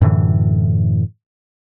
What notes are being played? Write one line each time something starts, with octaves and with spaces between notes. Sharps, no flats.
F#2 A2 D3 E3